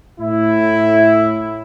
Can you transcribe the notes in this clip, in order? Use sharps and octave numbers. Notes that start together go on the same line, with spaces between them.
A2 E4